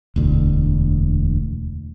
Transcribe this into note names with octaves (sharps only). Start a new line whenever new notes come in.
E1 D2